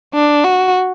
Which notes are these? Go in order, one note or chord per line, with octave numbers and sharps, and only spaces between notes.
D4
F#4